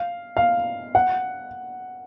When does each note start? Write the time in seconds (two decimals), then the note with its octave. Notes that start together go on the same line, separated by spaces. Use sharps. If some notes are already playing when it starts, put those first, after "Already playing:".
Already playing: F5
0.37 F5
0.95 F#5